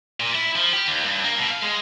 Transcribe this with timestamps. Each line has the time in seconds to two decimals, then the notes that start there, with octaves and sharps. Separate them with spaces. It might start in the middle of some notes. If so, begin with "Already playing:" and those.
0.20 A#2
0.35 E4
0.56 F3
0.73 G4
0.88 D#2
1.05 G2
1.24 A#3
1.38 B2
1.51 F5
1.62 G#3